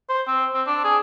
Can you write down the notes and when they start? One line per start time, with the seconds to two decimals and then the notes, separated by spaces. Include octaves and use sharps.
0.09 C5
0.27 C4
0.54 C4
0.67 D4
0.84 G#4